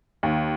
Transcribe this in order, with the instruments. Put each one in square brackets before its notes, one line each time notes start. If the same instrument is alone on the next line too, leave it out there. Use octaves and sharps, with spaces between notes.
[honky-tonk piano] D#2